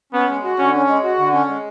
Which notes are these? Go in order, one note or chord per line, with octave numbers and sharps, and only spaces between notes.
B3 C#4
G#3
F#4
D3 C#4
C#4
G#3
F#4
D3
C#4
G#3